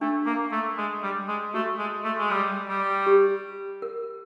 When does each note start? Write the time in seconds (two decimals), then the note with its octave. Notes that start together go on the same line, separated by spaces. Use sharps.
0.01 A3 D4
0.26 A#3
0.52 A3
0.78 G#3
1.03 G3
1.28 G#3
1.54 A3 F#4
1.79 G#3
2.04 A3
2.18 G#3
2.30 G3
2.68 G3
3.06 G4
3.82 A#4